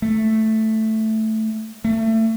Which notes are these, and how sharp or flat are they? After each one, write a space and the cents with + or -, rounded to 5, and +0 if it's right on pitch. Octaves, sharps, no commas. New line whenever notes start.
A3 +0
A3 +25